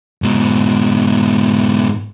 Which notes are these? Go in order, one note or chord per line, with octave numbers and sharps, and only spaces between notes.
G#2 B2